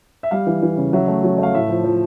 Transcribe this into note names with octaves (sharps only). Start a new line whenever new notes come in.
E5
G3 F5
E3
E3
C#3
F#3 E5
A3
F#3
A3
F5
A2 E5
F3
F3